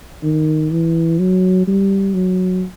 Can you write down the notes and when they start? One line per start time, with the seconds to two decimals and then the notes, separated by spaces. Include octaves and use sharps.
0.23 D#3
0.71 E3
1.19 F#3
1.67 G3
2.14 F#3